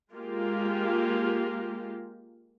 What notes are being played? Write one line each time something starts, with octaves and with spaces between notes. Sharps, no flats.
G#3 A#3 F4 G4